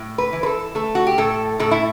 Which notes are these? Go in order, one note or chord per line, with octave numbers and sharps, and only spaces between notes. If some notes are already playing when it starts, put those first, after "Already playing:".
Already playing: A2
B4
E3
B4
A4
A3 A4
F#4
G4
A2 A4
A2 A4
E4